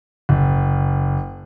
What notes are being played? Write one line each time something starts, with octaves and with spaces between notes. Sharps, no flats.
F#1